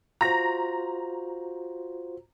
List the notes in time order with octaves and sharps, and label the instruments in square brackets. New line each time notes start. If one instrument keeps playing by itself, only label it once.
[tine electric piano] F4 F#4 C5 [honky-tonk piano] A#5 A#6